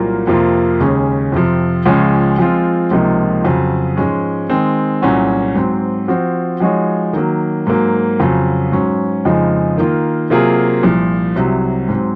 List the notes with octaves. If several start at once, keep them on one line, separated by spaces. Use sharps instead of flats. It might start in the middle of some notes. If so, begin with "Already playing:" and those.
Already playing: C2 A#2 F#3 A#3 F4
F2 C3 F3 A#3 F4
D#2 C#3 G#3 C#4 G#4
F2 C3 F3
C#2 C#3 F3 G#3 C#4
F3 G#3 C4 F4
C#2 C3 F3 A#3 D#4
F2 C#3 F#3
G#2 F3 G#3 C#4
D#3 G#3 C4
C2 A#2 F#3 C#4 F#4
G#2 F#3 C4
F3 C4 F#4 C5
F3 G#3 D#4 F#4 C#5
D#3 F#3 A#3
G#2 F#3 A#3
F2 C#3 F#3
G#2 F#3 C#4
F2 C#3 F3 G#3 D#4
D#3 A#3 F4
C3 F#3 A#3 F4 G#4
C2 A#2 F3
C2 C3 F#3
G#2 F#3 C4